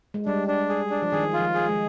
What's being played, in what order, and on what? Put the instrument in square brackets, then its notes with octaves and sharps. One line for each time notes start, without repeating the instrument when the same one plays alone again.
[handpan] G#3
[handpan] G3 [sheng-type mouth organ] D4
[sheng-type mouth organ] D4
G#4
D4
[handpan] F3
[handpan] D#3 [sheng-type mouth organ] G#4
[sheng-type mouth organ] F4
[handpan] F3
[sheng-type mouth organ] G#4
[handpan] G#3